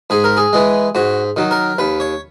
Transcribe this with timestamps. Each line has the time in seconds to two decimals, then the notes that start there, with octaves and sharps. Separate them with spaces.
0.10 G#2 G#4
0.24 A#4
0.37 G#4
0.53 E3 G#3
0.95 G#2 F#4
1.36 D#3 F#3
1.51 A#4
1.78 D#2 B4
2.00 C#5